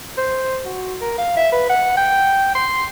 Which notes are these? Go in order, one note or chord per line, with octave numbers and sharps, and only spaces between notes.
C5
F#4
A#4
F5
E5
B4
F#5
G5
C6